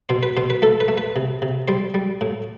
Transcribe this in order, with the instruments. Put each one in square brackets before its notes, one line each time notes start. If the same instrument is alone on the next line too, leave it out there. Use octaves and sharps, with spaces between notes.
[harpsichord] B2 C5
B4
B2 C5
B4
A3 A4
B4
A3
B4
C3
C3
G3 C5
G3
A2